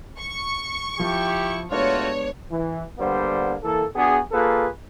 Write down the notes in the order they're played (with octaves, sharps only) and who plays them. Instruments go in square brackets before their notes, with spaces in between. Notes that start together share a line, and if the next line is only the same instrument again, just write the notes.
[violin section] C#6
[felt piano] F3 [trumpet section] E4 G4
[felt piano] G#3 B3 D4 [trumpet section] A3 F4 F#4 [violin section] C#5
[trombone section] E3
D3 G3 A#3 B3 C5
E3 A#3 A4
B3 D4 F#4 G#4
A#3 F4 G#4 A4 B4